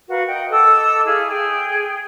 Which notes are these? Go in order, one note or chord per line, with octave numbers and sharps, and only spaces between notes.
F#4 A#4 B4 F5
D#5 F#5 G5
A4 D#5 D6 E6
E4 G#4 F5
G#4 G5